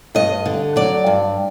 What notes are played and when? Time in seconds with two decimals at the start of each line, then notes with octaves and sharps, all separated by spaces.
0.15 G2 D#5
0.46 D3
0.76 F#3 D5
1.07 G2